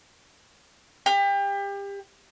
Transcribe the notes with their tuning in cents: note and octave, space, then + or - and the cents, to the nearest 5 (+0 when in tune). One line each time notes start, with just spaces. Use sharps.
G4 +30